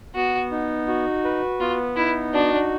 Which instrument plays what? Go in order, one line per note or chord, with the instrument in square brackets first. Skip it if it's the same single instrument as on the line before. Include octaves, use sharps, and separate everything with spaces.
[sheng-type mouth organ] B3 [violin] F#4
[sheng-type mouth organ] D#4
F#4
B4
[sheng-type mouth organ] B3 [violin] F4
[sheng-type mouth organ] D#4 [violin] E4
[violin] D4 [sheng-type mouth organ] F#4